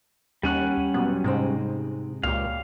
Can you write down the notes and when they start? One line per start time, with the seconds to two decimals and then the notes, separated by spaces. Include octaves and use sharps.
0.43 D#2 G3 C#4 F#5
0.94 A#2 F#3 B3
1.24 G#2 C3 G#3 C4
2.23 C#2 A#2 G4 F5